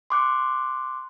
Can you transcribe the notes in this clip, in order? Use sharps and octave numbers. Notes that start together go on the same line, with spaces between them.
C6 D6 F#6 C#7